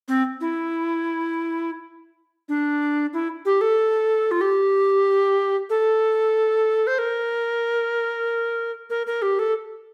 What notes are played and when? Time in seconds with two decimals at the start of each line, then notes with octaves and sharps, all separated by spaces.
0.08 C4
0.41 E4
2.49 D4
3.13 E4
3.45 G4
3.61 A4
4.31 F4
4.41 G4
5.70 A4
6.87 C5
6.99 A#4
8.90 A#4
9.07 A#4
9.22 G4
9.39 A4